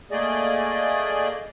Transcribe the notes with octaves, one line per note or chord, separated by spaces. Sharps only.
A3 A#3 G#4 D5 D#5